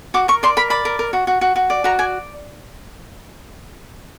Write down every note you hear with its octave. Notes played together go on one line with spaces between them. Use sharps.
F#4 D6
A#4 C#6
D5 C6
A#4 B5
D5 B5
A#4
A#4
F#4
F#4
F#4
F#4
D5
F#4 A#5
D5 G#5